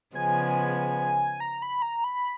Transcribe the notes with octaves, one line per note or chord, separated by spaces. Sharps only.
C#3 F3 G#3 B3 G#5
A#5
B5
A#5
B5